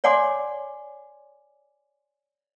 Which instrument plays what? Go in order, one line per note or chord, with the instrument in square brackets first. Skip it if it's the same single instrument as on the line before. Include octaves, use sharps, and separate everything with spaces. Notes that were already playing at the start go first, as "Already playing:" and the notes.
[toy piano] C#5 D5 F#5 G#5 C6 D6